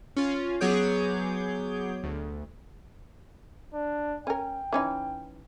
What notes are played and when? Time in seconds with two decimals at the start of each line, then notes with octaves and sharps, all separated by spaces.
0.17 C#4 F4
0.61 F#3 B3 G#4 C#5 D6 G6
2.04 D2
3.74 D4
4.27 C#4 A#4 G5
4.73 E3 C#4 D#4